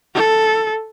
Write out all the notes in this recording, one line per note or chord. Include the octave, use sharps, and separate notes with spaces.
A4